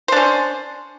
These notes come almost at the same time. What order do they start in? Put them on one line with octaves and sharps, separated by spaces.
C5 D4 C#4